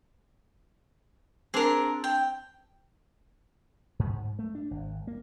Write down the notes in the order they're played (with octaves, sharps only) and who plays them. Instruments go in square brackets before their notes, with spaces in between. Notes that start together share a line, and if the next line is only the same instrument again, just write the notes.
[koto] C4 D4 [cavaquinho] G#4 A#4
[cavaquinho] G5
[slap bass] G#2
A3
D4
G#1
A#3